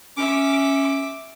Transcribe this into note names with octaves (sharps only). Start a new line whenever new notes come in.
C#4 E5 D6